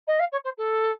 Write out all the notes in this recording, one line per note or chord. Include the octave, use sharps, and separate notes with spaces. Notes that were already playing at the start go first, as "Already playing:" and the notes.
D#5
F5
C#5
C5
A4